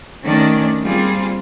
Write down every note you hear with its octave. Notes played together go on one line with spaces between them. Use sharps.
D#3 A3 C#4 D4 D5
G3 A#3 C4 F4 G#4